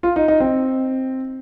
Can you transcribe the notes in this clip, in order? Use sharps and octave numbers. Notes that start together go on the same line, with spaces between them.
F4
D#4
D#4
C4